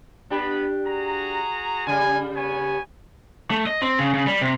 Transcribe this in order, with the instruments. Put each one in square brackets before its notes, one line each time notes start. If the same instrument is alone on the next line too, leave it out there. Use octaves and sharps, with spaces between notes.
[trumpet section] B3 B5 [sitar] D4 G4
[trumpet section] F#4 G#4 A#5
[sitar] C#3 G3 [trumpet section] G#5
[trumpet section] B3 C#5 G#5
[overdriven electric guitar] A3
D#5
C4
C#3
C#3
G3
C3